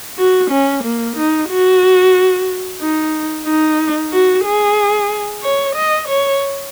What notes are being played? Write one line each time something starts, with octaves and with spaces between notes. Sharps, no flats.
F#4
C#4
A#3
D#4
F#4
D#4
D#4
F#4
G#4
C#5
D#5
C#5